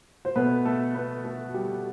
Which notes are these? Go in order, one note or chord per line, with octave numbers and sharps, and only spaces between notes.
C5
B2 A3 B3 B4
A3 A4
B3 B4
A3 A4
F#4
G3 G4